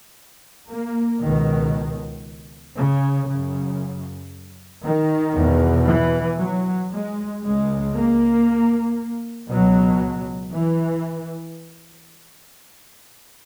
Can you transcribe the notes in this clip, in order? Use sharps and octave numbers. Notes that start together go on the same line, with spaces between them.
A#3
C#2 B2 D#3
C#3
F#2 C#3
D#3
E2 B2
E3
F#3
G#3
C#2 C#3 G#3
A#3
C#2 B2 F#3
E3